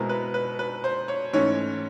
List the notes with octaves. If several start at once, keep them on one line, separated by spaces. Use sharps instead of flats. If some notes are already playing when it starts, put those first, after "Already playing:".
Already playing: B2 G#3 C4 E4 A#4
B4
B4
B4
C5
C#5
G#2 E3 A3 C#4 C#5